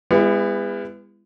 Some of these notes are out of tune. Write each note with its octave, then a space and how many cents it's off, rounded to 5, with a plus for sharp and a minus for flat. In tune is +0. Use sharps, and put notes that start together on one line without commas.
G#3 -40 B3 +15 E4 +25